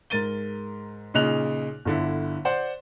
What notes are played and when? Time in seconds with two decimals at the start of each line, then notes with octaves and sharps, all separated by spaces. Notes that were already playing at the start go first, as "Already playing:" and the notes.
0.10 G#2 A#4 A6 D#7 G7
1.14 A#2 C#3 D#4 F#6 F7
1.85 G1 D3 E4
2.45 C5 D5 F#5